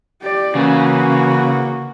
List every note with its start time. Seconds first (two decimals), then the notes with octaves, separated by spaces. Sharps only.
0.22 G4 D5
0.55 C#3 E3 A#3 F#4